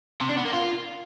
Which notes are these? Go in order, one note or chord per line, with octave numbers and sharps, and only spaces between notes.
C3
D4
B3
A#3
F4